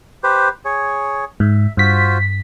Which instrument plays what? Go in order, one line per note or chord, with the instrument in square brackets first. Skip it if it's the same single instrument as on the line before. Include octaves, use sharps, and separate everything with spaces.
[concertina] G4 B4 C5
G#4 C#5
[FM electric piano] G#2 [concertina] E5
[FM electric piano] G2 B6 [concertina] F4 F#4 C5